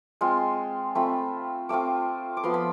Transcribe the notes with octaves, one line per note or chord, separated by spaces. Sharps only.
G#3 C4 F4 C6
A3 C4 F4 B5
A3 C4 F4 D6
D6
F3 B3 F4 C6
B5